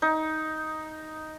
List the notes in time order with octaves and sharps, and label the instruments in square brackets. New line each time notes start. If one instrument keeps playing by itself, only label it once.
[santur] D#4